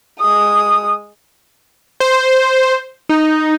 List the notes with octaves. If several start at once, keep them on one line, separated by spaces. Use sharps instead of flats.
G#3 D#6
C5
D#4